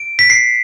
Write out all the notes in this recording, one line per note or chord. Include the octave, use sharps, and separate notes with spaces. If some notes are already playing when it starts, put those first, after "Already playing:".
Already playing: D7
B6
C7